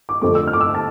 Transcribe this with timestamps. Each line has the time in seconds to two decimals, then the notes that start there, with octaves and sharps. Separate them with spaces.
0.09 D6
0.22 F2 D3 A3 C4 D6
0.35 E6
0.47 F6
0.53 D6
0.61 E6
0.75 A5